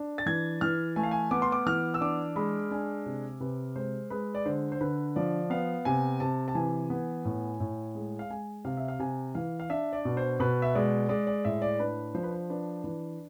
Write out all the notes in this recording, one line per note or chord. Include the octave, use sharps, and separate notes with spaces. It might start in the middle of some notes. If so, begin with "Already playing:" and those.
Already playing: D4
A6
E3 G#6
E3 F6
A3 G#5
F5
G#5
B3 D6
C6
D6
E3 F6
E6
D4 D6
G#3 B5
D4 G#5
C3
C3 B4
G#3 C5
G#3 B4
D5
D3 C5
C5
D3 B4
F3 D5
B3 F5
C3 G#5
C3 A5
A5
E3 G#5
B3
A2
A2
G#3
F5
G#3 G#5
C3 F5
E5
F5
C3 G#5
E3 F5
F5
D4 E5
D5
B2
C5
B2 B4
E5
G#3 D5
G#3 D5
D5
A2 E5
D5
D4 B4
F3 C5
B4
C5
D4 B4
E3 B4